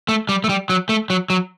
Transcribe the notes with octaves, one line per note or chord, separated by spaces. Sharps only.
A3
G3
A3
G3
F#3
A3
F#3
F#3